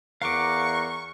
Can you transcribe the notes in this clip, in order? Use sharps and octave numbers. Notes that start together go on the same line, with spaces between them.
E2 A#4 F5 F#5 C#6 D6